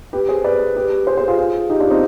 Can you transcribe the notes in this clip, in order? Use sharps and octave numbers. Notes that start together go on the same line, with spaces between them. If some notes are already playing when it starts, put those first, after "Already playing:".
G4 B4
G#4 C5
B4 D5
G4 B4
G#4 C5
G#4 C5
F4 G#4
F4 G#4
D#4 G4
D4 F4
C4 D#4